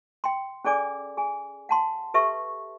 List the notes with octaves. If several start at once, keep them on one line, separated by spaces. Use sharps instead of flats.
G5 C6
C#4 G#4 A4 D5 G#5 D6
G#4 G#5
F#5 A5 C6
G4 A4 B4 E5 C#6